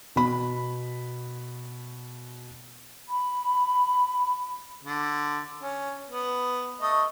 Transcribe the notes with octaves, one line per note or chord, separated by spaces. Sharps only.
B2 B5
B5
D3
C#4
B3
A3 D#5